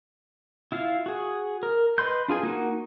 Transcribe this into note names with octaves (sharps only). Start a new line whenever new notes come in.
E4 F4 F5
F#4 G#4
A#4
B4 D#5 B5 C6 G6
D4 F4 G#4 G#5
A#3 D#4 F#4